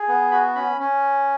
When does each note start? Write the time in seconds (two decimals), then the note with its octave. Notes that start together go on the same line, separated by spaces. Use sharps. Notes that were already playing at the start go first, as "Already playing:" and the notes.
Already playing: G#4
0.08 B3
0.31 F#4 B5
0.56 C#4 B5
0.80 C#4